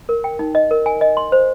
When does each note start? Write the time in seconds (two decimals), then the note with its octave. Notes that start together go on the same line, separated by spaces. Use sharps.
0.09 A#4
0.24 G5
0.39 D#4
0.55 D#5
0.71 A#4
0.86 G#5
1.01 D#5
1.17 C6
1.32 C5